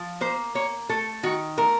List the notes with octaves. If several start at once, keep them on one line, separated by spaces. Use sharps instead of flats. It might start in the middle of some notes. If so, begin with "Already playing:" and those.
Already playing: F3
A#3 C5
A#3 C#5
A3 A4
D#3 F#4
A3 A#4